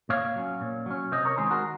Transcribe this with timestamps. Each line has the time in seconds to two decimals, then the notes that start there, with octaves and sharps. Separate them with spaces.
0.09 A#2 C#5 F5
0.36 F#3 C#4
0.61 A#2
0.86 F#3 C#4
1.12 C3 C5 D#5
1.25 A#4 C#5
1.37 D#3 G#3 C4 G#4 C5
1.51 F#4 A#4